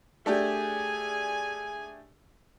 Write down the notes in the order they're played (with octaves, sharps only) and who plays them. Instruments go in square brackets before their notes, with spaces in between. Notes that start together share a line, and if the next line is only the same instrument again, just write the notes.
[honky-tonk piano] A3 D4 G4 [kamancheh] G#4 G#5